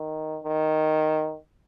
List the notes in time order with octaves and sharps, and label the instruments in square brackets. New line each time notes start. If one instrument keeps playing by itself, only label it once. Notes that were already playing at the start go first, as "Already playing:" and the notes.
Already playing: [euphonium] D#3
D#3